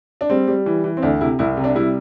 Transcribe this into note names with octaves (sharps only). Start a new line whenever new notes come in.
D4
G3 C4
G3
E3
E3
C4
D2 D4
C3 E4
C2 E4
C3
D4
G3 E4